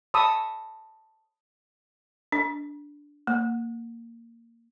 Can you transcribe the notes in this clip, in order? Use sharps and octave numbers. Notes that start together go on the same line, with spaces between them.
A5 B5 C#6 D#6 E6
D4
A#3